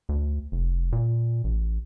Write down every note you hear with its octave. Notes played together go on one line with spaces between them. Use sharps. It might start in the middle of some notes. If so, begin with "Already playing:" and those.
D2
F1
A#2
A1